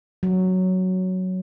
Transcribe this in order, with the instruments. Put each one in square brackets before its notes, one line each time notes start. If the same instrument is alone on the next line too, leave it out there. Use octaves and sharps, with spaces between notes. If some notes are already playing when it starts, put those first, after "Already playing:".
[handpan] F#3